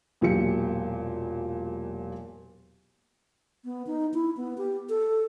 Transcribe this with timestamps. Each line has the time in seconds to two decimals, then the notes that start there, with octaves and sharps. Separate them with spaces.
0.21 E1 A#2 F#3 G4 C#7
3.65 B3
3.87 D#4
4.14 E4
4.37 B3
4.58 G4
4.89 A4